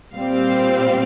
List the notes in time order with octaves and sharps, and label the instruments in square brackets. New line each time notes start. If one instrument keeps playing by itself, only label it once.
[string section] A#2 G3 C4 F5